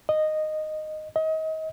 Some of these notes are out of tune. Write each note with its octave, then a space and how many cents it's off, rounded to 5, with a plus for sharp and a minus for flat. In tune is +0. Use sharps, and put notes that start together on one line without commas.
D#5 -10
D#5 +30